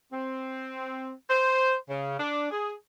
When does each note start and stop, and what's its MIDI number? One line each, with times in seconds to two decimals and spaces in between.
0.13 1.11 60
1.30 1.75 72
1.90 2.15 49
2.19 2.48 62
2.51 2.73 68